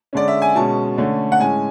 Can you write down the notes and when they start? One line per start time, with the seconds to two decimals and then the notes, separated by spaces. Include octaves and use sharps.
0.13 D3 G#3 C#4 D5
0.28 E5
0.42 G#5
0.55 B2 G#3 C#4 A5
0.98 D3 A3 C#4
1.32 F#5
1.39 A2 G#3 C#4 G#5